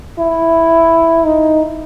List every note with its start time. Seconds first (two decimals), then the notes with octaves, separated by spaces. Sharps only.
0.19 E4
1.24 D#4